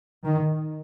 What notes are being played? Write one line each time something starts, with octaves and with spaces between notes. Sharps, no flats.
D#3